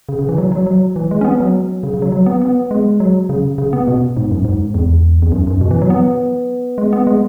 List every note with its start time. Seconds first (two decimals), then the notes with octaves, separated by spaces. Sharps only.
0.09 C#3
0.19 C#3
0.29 E3
0.38 F#3
0.52 F#3
0.67 F#3
0.96 E3
1.11 G#3
1.21 C#4
1.24 B3
1.40 F#3
1.83 C#3
1.94 C#3
2.02 F#3
2.12 F#3
2.26 B3
2.42 B3
2.71 G#3
3.00 F#3
3.29 C#3
3.58 C#3
3.73 B3
3.88 B2
4.17 G#2
4.31 F#2
4.45 G#2
4.74 E2
5.22 E2
5.32 F#2
5.47 F#2
5.61 B2
5.71 E3
5.82 F#3
5.90 B3
6.78 G#3
6.93 B3
7.07 G#3